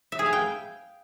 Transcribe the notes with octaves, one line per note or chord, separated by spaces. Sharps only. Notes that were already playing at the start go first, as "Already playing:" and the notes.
E5
G#4
F5
G5